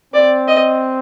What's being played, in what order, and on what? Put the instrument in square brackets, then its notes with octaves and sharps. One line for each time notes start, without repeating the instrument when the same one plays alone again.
[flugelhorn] C4 [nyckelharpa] D5
[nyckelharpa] D#5